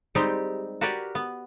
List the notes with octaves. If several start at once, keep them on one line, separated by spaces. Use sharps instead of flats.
G3 G#3 C4 D#4 G4
F#4 G4 A#4 B4 D5
B3